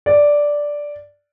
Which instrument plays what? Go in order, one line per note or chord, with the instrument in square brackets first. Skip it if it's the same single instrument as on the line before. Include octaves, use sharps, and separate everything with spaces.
[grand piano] D5